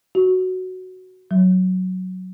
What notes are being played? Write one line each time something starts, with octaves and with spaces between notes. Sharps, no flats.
F#4
F#3